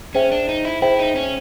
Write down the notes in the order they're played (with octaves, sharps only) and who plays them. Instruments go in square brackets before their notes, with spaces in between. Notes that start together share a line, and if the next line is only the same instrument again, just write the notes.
[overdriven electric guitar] C#4 [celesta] G#4 C5 E5 G5
[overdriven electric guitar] D4
D#4
E4
[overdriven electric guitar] E4 [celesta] G#4 C5 E5 G5
[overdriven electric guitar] D#4
C#4